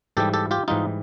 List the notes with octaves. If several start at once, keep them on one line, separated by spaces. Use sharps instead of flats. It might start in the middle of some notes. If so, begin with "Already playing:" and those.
G#2 E3 G3 G4 A4
G4 A4
F4 G4
G#2 E3 G3 D#4 F4